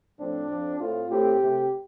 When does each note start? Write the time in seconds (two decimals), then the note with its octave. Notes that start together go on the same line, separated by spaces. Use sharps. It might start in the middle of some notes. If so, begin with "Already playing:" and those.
0.18 A2 F3 C4 D4
0.48 F2 F3 C4
0.79 A2 A3 C4 F4
1.08 A2 A3 C4 G4
1.39 C3 A3 C4